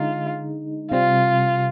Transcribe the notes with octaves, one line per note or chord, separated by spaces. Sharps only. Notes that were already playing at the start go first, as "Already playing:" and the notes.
Already playing: D3 G#3 D#4 F4
C3 G3 C4 F4